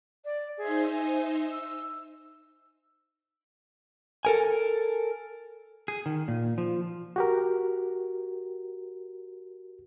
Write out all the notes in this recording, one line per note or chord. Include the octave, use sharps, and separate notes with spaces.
D5
D#4 G#4 C5 E5
G#5
E6
A4 A#4 G#5
G#4
D#3
A#2
F3
F#4 G4 A#4